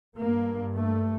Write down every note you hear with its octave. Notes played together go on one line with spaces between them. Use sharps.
G2 A#3
A3